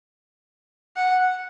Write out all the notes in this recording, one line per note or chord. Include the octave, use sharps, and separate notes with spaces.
F#5